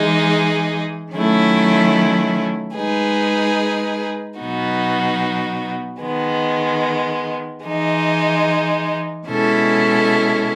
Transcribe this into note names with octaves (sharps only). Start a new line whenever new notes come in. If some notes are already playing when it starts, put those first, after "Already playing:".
Already playing: E3 G#3 D#4 G#4
D#3 F#3 A3 C#4 E4
G#3 D#4 G#4 B4
B2 F#3 B3 D#4 F#4
D#3 G#3 B3
E3 G#3 D#4
B2 G#3 C#4 E4 A4